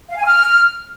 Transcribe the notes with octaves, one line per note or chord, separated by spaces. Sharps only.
F5
G#5
F6